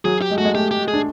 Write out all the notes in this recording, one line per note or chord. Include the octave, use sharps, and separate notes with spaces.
F#3 G#4
G4
G#3
A3 F#4
G#3
A3 G4
G4
G#4
D4